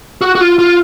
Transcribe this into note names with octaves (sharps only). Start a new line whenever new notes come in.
F#4
F#4
F4
F4